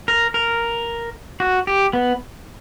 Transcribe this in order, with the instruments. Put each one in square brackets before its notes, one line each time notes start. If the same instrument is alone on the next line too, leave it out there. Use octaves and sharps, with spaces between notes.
[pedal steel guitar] A#4
A#4
F#4
G4
B3